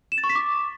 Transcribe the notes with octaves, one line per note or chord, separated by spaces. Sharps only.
E7
A6
C#6
B6
D6